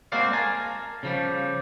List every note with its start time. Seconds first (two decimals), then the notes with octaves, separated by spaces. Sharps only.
0.12 G#3 A#3 C4 F#4 D5 F5
0.33 A#4 G#5 A5
1.03 C#3 F3 G3